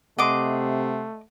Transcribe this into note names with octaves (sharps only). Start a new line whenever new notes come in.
C3 A3 D#5 F#5 C6 D6